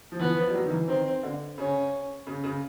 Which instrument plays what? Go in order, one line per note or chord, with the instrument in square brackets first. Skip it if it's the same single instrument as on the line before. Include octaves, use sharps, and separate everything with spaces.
[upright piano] F3
[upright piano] E3 [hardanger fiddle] B3
[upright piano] F3
G3
F#3
D#3
E3
[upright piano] D#3 [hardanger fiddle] C4
[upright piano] D3
[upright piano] C#3 [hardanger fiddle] C#4
[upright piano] C#3
C#3